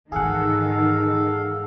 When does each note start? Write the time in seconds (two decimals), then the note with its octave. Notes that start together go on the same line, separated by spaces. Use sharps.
0.12 G#2 D#3 E3 G#4 A4 F5 F#5